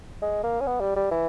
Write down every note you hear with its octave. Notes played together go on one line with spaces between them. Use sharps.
G#3
A#3
C#4
B3
G3
G3
E3